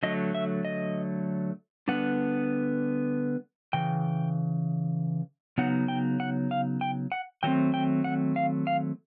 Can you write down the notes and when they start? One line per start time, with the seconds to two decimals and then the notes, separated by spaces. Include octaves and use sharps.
0.03 D3 F#3 A3 D#5
0.35 E5
0.65 D#5
1.88 D3 G3 B3 D4 F#5
3.73 C#3 E3 G5
5.58 C#3 F#3 B3 D#4 F#5
5.88 G5
6.20 F#5
6.51 F5
6.81 G5
7.12 F#5
7.43 D#3 F#3 A3 C4 G5
7.74 G5
8.04 F#5
8.36 F5
8.67 F5